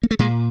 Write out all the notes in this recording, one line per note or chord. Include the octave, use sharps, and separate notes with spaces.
A#3
A3
A#2 G#3